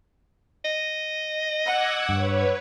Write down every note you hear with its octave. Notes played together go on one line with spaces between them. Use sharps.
D#5
F#5 D6 E6 G#6
G2 B4 C#5